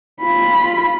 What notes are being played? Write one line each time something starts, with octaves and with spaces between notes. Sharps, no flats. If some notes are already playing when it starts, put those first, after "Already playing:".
F4 B5